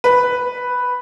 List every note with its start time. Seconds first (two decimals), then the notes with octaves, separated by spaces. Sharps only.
0.04 B4